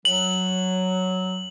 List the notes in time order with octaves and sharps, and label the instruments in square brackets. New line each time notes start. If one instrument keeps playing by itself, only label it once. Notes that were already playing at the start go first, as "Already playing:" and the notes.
[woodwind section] F#3 [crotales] F#7